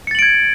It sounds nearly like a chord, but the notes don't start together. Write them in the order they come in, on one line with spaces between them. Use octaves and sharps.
C#7 A6 F#7 D7 G#6